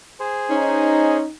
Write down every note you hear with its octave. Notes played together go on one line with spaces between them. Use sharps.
G#4 C5
C#4 D#4